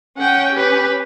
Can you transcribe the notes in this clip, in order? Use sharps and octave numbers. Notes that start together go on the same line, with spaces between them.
C#4 F#5 G5
G4 B4